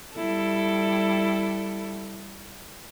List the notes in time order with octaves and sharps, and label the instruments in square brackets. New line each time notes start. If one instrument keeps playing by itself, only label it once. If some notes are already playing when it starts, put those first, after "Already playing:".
[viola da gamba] G3 E4 A4